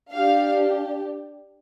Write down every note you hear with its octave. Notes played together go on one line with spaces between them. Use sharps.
D4 G4 F5